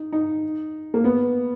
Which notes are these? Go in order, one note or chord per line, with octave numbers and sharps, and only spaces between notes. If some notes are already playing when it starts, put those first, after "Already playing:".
Already playing: D#4
D#4
A#3
B3